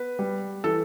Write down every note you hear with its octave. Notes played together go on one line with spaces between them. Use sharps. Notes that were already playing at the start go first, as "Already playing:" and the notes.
Already playing: B3 B4
G3
E3 A4